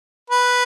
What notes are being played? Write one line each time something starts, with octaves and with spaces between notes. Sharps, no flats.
B4